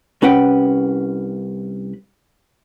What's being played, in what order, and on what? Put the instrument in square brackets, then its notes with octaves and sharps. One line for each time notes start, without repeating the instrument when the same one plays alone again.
[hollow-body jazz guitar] C2 C#4 B4 F#5 G5